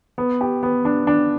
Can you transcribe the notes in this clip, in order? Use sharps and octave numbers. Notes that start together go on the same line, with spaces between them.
B3
G4
B3
D4
D4